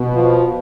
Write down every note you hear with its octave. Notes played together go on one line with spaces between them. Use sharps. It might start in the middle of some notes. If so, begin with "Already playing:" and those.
Already playing: B2
F3